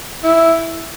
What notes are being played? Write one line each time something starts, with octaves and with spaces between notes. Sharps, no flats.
E4